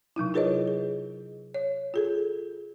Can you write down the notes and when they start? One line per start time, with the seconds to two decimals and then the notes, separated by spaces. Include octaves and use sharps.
0.16 C3 F#3 D#4 E4
0.34 F4 G#4 A#4 B4 C#5 D#5
0.68 G#4
1.54 C#5
1.94 F4 G#4 A4